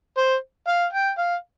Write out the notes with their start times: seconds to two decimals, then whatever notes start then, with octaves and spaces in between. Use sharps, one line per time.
0.17 C5
0.67 F5
0.93 G5
1.18 F5